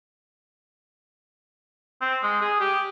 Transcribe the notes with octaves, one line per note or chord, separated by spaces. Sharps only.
C4
G#3
G#4
G4